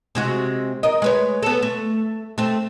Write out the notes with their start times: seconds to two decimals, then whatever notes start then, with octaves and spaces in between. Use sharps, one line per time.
0.15 C3 G#3 F#4
0.83 A#4 D#5
1.02 G#3 B4 C#5
1.43 B3 A4
1.63 A3
2.38 A3 C4